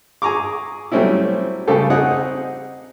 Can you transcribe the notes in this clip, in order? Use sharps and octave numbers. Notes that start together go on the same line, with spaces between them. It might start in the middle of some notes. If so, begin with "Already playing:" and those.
G#4 G#5 A#5 C#6 D6
F#3 G3 A3 C4 C#4 E4
C#3 G3 A3 G4 A4 C5
C4 D#4 G#4 F#5